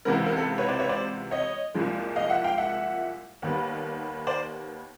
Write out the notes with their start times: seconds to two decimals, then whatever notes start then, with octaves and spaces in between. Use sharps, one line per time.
0.05 C#2 C3 E3 G#3 B3 A#4
0.26 A#4
0.37 A4
0.58 B4 C#5
0.69 C5 D5
0.79 B4 C#5
0.89 C5 D5
1.31 C#5 D#5
1.74 C2 A#2 F3 G#3
2.16 D#5 F5
2.30 E5 F#5
2.44 F5 G5
2.58 E5 F#5
3.42 D#2 D#3 G3 B3
4.27 C5 D5